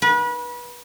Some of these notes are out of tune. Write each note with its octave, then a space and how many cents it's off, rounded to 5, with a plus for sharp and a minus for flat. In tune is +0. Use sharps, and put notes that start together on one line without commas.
B4 -30